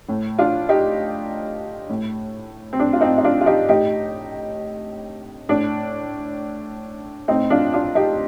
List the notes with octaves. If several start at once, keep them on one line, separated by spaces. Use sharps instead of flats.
A2
D4 F4
D#4 G4
A2
C4
D4
F4
C4 D#4
D#4
D4 F4
F4
D#4 G4
A2 D#4 G4
A2 D4
A2 C4 D#4
D4 F4
D4 F4
D#4 G4